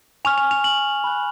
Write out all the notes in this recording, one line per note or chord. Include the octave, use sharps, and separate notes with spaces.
G#5 C#6 F6 F7
F7
F7
F#7
B5 F#6